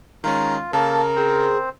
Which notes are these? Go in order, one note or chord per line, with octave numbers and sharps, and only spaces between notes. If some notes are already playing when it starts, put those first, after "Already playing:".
D#3 G#3 C#4 F4 A#5
C#3 A#3 A4 A#4 A5
C4 G#4 C5